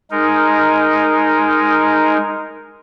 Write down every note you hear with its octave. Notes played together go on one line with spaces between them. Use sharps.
G#3 D#4 A#4